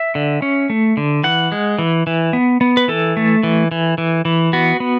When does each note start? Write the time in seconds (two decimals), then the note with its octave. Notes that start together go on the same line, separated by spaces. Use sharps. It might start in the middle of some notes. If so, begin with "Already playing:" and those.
Already playing: E5
0.15 D3
0.42 C#4
0.70 A3
0.97 D3
1.24 E3 F#5
1.52 G#3
1.79 E3
2.07 E3
2.33 B3
2.61 B3
2.77 B4
2.88 E3 A4
3.17 A3
3.43 E3
3.71 E3
3.98 E3
4.25 E3
4.53 B3 F#4
4.80 B3